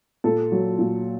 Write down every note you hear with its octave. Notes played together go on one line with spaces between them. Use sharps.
A#2 A4
F#3
A#2